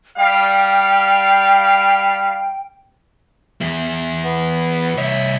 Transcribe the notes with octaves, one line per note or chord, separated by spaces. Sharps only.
G3 F5 G5
E2 E4
B3
C2 C#5 E5